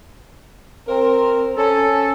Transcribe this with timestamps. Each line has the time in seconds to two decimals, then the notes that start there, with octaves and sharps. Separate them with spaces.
0.88 C4 A#4
1.57 C#4 A4